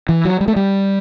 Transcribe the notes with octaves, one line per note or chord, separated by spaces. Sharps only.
E3
F#3
G3
A3
G3